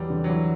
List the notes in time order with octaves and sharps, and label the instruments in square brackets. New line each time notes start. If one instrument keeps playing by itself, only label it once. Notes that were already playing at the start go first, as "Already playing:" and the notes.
Already playing: [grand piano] E2 [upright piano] F#3 G3
[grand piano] D3
[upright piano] F#3
E3